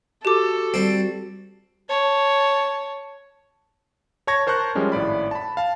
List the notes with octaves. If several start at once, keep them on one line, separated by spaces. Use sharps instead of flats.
F#4 G4 A4 D6
G3 C4
C#5 A5
C#5 A5 C#6 G#6 A#6
A#4 C5 A5 C#6 F#6
F3 G3 G#3 C#4
G#1 A2 D5 B5
A5 B5
F5 A5